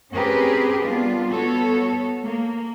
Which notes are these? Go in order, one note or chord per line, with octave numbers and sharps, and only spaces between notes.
C4 C#4 G4 G#4 A#4 B4
G3 B3 D4 F4
B3 F#4 A4 C#5
A#3